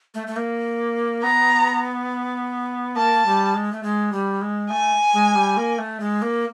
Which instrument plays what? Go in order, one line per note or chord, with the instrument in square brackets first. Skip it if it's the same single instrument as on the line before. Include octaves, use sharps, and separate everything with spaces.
[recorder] A3
A3
A#3
[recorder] B3 [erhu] A#5
[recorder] A#3 [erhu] A5
[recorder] G3
G#3
A3
G#3
G3
G#3
[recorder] A3 [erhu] G#5
[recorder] G#3
G3
A#3
A3
G#3
A#3